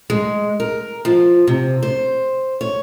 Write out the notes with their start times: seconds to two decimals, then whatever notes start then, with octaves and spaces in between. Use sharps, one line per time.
0.10 G#3
0.60 A#4
1.05 F3
1.47 C3
1.83 C5
2.61 C#5